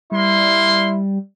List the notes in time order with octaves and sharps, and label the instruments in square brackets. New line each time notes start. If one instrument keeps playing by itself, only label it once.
[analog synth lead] G3 [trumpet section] A#3 C6 [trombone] E4